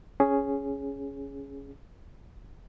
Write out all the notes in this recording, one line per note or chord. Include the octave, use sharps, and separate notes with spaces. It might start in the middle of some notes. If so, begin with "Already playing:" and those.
C#4 G#4